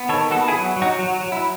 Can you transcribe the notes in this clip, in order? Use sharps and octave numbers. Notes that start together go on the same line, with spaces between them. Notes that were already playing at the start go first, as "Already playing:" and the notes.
Already playing: B3
D#3 A4 C#5
B3 F#4 A4
E4 G#4
F#3
F#3
D#4 F#4
F#3
F#3
E4